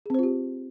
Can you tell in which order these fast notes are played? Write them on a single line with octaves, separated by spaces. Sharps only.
G#4 C4 C5 F4 G4